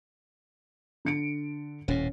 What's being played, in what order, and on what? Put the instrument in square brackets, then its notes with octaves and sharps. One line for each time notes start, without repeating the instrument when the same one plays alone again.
[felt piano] D3 C#7 D7
[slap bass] D#1 A2 [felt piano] C#4